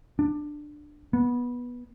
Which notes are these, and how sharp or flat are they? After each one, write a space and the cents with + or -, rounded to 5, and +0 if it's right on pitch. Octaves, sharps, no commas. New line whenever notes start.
D4 +15
B3 -15